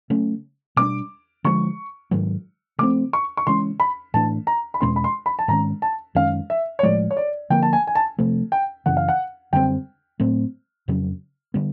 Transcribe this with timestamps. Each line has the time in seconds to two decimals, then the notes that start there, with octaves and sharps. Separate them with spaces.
0.10 C#3 F#3 A3 C#4
0.76 B2 G3 A#3 D4 D6
1.44 D3 F3 G#3 C#6
2.11 G#2 D#3 F#3
2.79 C#3 F3 A3 C4 D6
3.13 C#6
3.37 C#6
3.47 C#3 E3 G#3 C#4 C6
3.80 B5
4.14 A2 E3 A3 D4 A5
4.47 A#5
4.74 B5
4.81 E2 B2 G#3 C#4 C6
4.96 B5
5.04 C6
5.26 B5
5.39 A5
5.48 G#2 D#3 G#3 C#4 A#5
5.82 A5
6.15 F#2 D#3 G#3 C#4 F5
6.50 E5
6.79 C#5
6.83 A2 F3 G#3 D5
7.11 C#5
7.17 D5
7.50 D3 F3 A#3 G5
7.63 A5
7.73 G#5
7.87 G#5
7.95 A5
8.19 C3 F3 A3
8.52 G5
8.86 F#2 C#3 E3 F#5
8.97 F5
9.09 F#5
9.53 F#2 D3 G3 C4 G5
10.20 A2 F#3 A3 C4
10.88 F2 C#3 F#3
11.54 D3 G3 B3